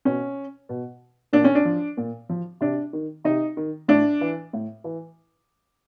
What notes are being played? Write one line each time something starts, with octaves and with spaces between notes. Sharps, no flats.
B2 C#4
B2
A#2 D4
C#4
D4
F3
A#2
F3
C3 D4
D#3
C3 D#4
D#3
A2 D4
E3
A2
E3